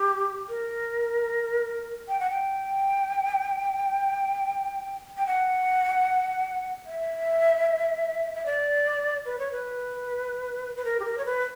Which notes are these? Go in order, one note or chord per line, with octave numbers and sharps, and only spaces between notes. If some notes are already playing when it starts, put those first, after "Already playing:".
Already playing: G4
A#4
G5
F#5
G5
G5
F#5
E5
E5
D5
B4
C#5
B4
B4
A#4
G4
A#4
C#5
B4